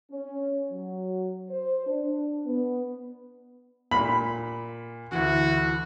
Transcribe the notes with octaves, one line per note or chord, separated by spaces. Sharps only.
C#4
F#3
C5
D4
B3
A#2 B5
D2 E3 E4 F#4